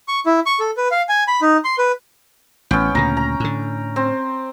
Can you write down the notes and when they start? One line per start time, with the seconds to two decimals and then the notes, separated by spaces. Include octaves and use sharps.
0.08 C#6
0.26 E4
0.46 C#6
0.60 A4
0.77 B4
0.91 F5
1.09 G#5
1.28 B5
1.42 D#4
1.64 C6
1.78 B4
2.71 A1 B3 C#4 G5
2.95 D2 A#2 C#3 A#5
3.17 A#5
3.40 A2 D3
3.96 C4